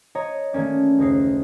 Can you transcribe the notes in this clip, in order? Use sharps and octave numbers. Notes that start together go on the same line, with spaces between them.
C#5 D#5 A#5
D#3 A3 A#3 C#4 D5
F#1 D#2 D#4 C7